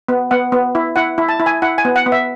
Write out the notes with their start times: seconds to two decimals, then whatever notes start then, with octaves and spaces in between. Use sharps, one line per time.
0.08 B3
0.31 B3 F#5
0.52 B3
0.75 E4
0.96 E4 F#5
1.18 E4
1.29 A5
1.40 E4
1.46 G#5
1.62 E4 F#5
1.78 G#5
1.85 B3
1.96 F#5
2.06 B3
2.12 E5